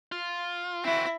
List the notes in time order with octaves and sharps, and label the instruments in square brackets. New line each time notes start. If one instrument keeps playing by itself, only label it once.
[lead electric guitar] F4
[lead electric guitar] C4 F#4 [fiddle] E4